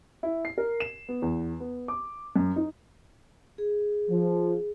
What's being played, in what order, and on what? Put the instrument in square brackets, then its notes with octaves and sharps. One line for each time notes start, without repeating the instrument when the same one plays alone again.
[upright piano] E4
C7
A#4
E7
B3
E2
B3
D6
F#2
D#4
[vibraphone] G#4
[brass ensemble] F3